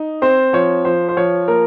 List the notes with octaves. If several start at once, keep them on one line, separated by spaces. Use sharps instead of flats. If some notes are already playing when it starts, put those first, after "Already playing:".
Already playing: D#4
C4 C5
F3 C#5
F3 C5
C5
F3 C#5
A#3 A#4